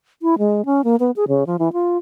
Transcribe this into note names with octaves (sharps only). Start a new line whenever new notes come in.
E4
G#3
C#4
A#3
B3
G#4
C#3
F3
E3
F4